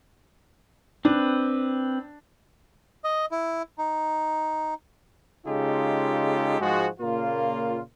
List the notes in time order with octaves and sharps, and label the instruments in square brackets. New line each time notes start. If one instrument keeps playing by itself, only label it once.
[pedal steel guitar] C4 B4 [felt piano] D4
[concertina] D#5
E4
D#4
[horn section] C#3 G#3 D#4 F4 G4 A4
G#2 F3 G#3 F#4
A#2 C#3 A#3 F4